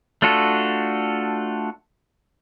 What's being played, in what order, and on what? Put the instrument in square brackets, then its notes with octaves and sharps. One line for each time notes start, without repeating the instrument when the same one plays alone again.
[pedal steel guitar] A3 D4 F4 F#4 A4